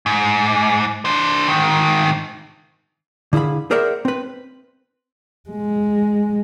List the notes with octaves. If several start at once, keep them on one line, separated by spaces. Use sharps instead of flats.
G#2
D4 C5
G#2 D#3
D3 E4 G#4 F5 B5
G#4 A#4 C5 D5 E5 F#5
C4 B4
G#3